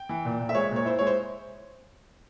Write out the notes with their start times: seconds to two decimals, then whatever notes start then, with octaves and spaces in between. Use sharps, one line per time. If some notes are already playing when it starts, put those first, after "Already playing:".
Already playing: G5
0.09 E3
0.25 A#2
0.40 A#2
0.49 E5
0.55 G#3 C#5
0.71 A#2
0.76 C#5
0.85 E4 C5
0.99 G#3 C#5
1.07 C5